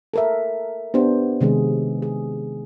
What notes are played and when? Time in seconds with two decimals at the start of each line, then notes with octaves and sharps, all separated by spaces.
0.14 A4 A#4 E5
0.94 B3 D4 G4 C5
1.41 C3 D#3 G#3 G#4
2.02 G#4